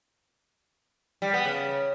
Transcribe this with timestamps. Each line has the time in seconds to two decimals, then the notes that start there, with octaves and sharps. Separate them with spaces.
1.22 G3
1.33 B3
1.45 C#3